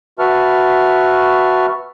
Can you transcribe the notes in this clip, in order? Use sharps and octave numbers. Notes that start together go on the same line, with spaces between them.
F#4 B4 E5 A5 C#6 F6